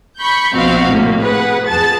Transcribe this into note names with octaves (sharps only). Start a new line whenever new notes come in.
B5 C#6 G6
A#1 B2 F3 C4 F#4 F5
A2 C3 A#3
G#4 B4 F#5
F2 G#4 A5 A6